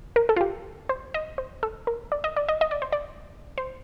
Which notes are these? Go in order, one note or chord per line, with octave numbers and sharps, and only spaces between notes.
A#4
A4
F4
G4
C5
D#5
C5
A4
A#4
D5
D#5
D5
D#5
D#5
D5
C5
D5
C5